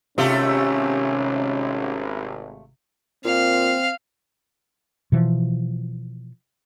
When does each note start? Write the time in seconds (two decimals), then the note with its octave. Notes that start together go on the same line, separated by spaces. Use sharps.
0.18 G#1 C3 A3 C#4 F4 G4
3.25 A#2 C4 F5
5.12 B2 E3 F3